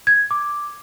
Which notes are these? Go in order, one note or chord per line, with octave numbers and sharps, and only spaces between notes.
G#6
D6